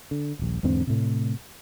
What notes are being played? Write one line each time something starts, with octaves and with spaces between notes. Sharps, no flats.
D3
D#1 A#1
E2 G#2 D3 C4
A2 C3